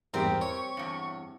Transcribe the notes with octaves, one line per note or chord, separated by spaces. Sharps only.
E2 G#2 G3 B3 C4 G4 A#4
C#5 C#6
E2 G2